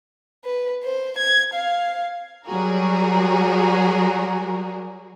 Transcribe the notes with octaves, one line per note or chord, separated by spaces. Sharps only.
B4
C5
G#6
F5
F#3 G3 F#4 G#4 A#4